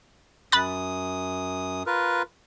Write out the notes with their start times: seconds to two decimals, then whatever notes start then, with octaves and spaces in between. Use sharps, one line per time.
0.52 F#2 B5 D#6 F#6 A6
1.86 F4 A#4 B4